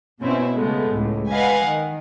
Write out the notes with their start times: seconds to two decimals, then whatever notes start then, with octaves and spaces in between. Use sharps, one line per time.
0.21 B2 C4 C#4 E4
0.55 C#3 G#3 A3 B3
0.90 C#2 A2
1.31 B4 D#5 F5 F#5 G#5
1.63 D#3